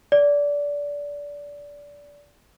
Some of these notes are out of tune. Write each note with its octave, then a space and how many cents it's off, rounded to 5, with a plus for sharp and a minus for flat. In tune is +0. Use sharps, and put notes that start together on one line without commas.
D5 -20